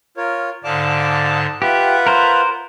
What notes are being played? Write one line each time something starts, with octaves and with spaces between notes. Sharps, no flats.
F4 A#4 C#5
G#2 D3 D5 F5 A5 D6
F4 G4 B4 E5 F#5
A#4 C5